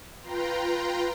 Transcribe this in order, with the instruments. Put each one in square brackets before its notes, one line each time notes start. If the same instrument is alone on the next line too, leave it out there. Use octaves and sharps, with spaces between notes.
[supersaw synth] F4 B4 G5 A#5 C6